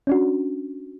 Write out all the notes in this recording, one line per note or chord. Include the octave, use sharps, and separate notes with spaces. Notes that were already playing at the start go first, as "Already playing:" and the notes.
C#4 D4 F#4